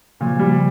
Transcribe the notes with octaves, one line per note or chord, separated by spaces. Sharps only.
A#2 C#3 F3
G3